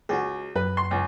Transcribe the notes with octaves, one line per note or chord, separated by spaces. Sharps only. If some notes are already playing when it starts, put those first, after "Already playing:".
C#2 F#4 G#4
F#2 B4
C6
C#2